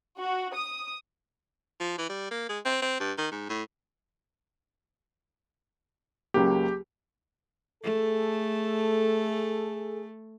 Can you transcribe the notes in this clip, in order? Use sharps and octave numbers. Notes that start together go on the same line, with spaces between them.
F#4
D#6
F3
E3
G3
A#3
G#3
C4
C4
G2
D#3
G#2
A2
C#2 F#3 A#3 G4
A3 G#4 A4